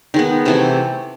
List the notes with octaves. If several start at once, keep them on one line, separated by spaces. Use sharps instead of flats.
D#3 G#3 B3
C3 E3 A3 A4